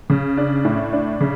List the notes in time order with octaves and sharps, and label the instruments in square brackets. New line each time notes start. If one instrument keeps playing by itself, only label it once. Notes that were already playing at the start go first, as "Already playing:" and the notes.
[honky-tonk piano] C#3
D4
A2
D4
C#3